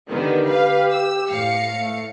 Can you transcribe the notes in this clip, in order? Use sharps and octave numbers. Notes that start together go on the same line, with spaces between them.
D3 D#3 B3 G4
B4 F5
E6
A2 F5 C#7
A3